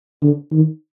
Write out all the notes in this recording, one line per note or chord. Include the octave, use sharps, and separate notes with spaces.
D3
D#3